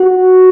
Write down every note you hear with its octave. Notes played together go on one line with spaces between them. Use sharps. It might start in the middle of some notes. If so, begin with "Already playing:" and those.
Already playing: F#4